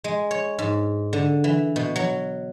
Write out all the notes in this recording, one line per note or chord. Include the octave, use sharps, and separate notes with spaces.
G#3
C#5
G#2
D3
E3
B2
F#3